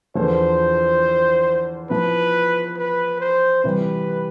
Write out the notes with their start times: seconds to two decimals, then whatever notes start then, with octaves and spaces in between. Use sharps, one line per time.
0.15 E2 D3 F3 C5
1.90 F3 B3 E4 B4
2.77 B4
3.20 C5
3.64 C3 E3 G3 B4